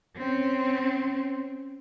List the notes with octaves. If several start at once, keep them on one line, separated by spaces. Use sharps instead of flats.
C4 C#4